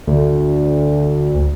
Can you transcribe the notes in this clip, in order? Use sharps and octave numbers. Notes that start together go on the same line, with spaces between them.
D2